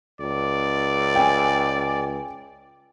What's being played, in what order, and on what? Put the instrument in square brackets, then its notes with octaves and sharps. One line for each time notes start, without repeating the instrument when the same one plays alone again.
[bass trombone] C#2 [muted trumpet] D5
[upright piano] G5 G#5